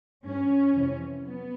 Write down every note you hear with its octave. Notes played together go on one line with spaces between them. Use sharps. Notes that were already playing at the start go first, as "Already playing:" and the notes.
G2 E3 C#4
F2 C3 E3
F#3 B3